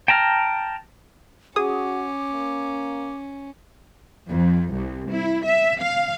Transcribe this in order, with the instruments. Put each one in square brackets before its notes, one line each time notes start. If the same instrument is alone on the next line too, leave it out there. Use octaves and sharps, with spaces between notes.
[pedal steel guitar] G5 A5 A#5 F6
[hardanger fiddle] C#4 [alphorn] F#4 [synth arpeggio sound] G#4 D#6 [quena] D6
[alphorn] A#3
[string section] F2
C2
E4
E5
F5